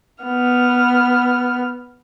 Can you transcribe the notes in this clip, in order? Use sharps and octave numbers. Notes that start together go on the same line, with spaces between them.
B3 F6